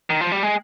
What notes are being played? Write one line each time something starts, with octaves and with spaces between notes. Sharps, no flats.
D#3
F3
G3
G#3